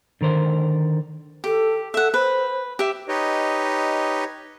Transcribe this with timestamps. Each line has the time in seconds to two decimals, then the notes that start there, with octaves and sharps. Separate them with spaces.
0.21 D3 D#3 A#4 C5
1.44 G4 A4
1.94 A4 E5 F#5
2.14 B4 C5
2.79 G4 E5
3.08 D#4 G4 B4 C#5 D#5